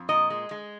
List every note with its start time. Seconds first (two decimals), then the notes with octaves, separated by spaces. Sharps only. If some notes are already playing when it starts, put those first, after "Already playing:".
Already playing: F2
0.09 A#2 D#5
0.30 G#3
0.51 G#3